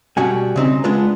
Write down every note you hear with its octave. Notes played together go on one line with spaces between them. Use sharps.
B2 G3 F#4 G#5
C#3 C4 D#4
G#3 B3 D4 F4 B4